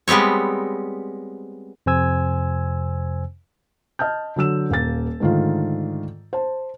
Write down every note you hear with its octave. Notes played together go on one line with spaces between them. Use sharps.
G3 G#3 B3 C4 C#5
F2 C3 C5 G#5 E6 G#6
D#5 A5 F6 G6
D3 F#3 E6 E7
D#1 A#3 A6
G#2 D3 D#3 A3 F4
C5 A5